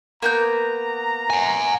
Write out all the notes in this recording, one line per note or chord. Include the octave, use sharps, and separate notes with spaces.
A#3 B3 A#5 G6
F#5 G#5